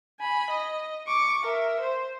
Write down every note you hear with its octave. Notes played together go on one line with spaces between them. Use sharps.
G#5 B5
D#5
C#6 D6
A#4 E5
C5